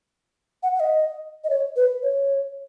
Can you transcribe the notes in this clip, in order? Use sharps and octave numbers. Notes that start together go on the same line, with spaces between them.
F#5
F#5
D#5
D#5
C#5
B4
C#5